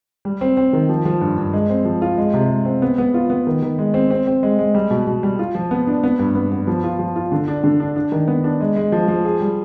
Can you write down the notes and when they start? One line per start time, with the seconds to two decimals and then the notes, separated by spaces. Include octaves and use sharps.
0.25 G3
0.41 C4
0.57 C4
0.73 D#3
0.89 F3
1.05 F3
1.21 G2
1.38 G2
1.53 G#3
1.69 C4
1.85 F3
2.02 F4
2.18 G#3
2.34 C3
2.50 G#3
2.65 C4
2.82 B3
2.98 B3
3.14 F4
3.30 B3
3.47 D#3
3.62 D#3
3.79 G#3
3.94 C4
4.11 C4
4.27 C4
4.43 G#3
4.59 G#3
4.75 G3
4.91 B2
5.07 B2
5.23 G3
5.39 F4
5.55 F3
5.71 B3
5.87 D4
6.03 B3
6.19 G2
6.35 B3
6.52 B3
6.67 F3
6.84 F4
6.99 F3
7.16 F4
7.32 D3
7.48 D4
7.63 D3
7.80 D4
7.96 D4
8.12 D#3
8.28 B3
8.44 D4
8.61 G#3
8.76 G#3
8.92 F3
9.08 F3
9.25 G#4
9.40 G3